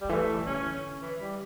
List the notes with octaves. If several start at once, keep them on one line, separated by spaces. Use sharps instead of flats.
G3
D3
E3 A3
E3
D3 C#4
E3
G3